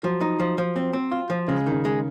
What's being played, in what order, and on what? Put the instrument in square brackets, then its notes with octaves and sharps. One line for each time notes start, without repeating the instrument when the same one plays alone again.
[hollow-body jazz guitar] F3 [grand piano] F#3
[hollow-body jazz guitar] D#4
F3
F3
C4
C4
F4
F3
[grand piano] C#3 [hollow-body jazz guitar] G#3
[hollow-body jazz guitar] D#3
[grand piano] C#3
[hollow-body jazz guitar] G#3